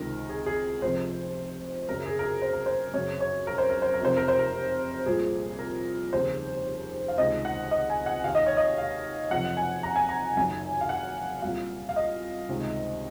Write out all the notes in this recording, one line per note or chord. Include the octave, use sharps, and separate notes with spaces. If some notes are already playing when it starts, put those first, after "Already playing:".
Already playing: C#2 C3 D#3 A#4
G#4
G#4
F1 F2 C3 C5
F#1 F#2 C#3 A#4
G#4
A#4
G#4
C5
A#4
C5
F#1 F#2 C#3 C#5
C#5
A#4
C5
A#4
C5
A#4
F1 F2 C3 C5
A#4
C5
A#4
C2 A#2 G#4
A#4
F1 D#2 C#3 C5
F5
C#2 C3 D#3 D#5
F#5
D#5
G#5
F#5
D#2 D#3 F5
D#5
C#5
D#5
F5
F#1 F2 C3 F#5
G#5
A#5
G#5
A#5
F#1 F#2 D#3 G#5
F5
F#5
C2 A#2 F5
F5
D#5
C#2 C3 D#3